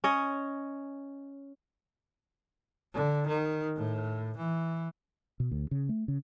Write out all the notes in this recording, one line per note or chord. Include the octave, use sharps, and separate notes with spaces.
C#4 C#5 D#5
D3
D#3
A2
E3
B2
D2
C#3
A3
C#3